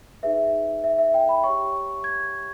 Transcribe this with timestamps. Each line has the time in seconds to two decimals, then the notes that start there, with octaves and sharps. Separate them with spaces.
0.23 D#4 G#4 B4 E5
0.84 E5
0.98 E5
1.14 G5
1.29 B5
1.44 G4 C#5 C#6
2.04 G#6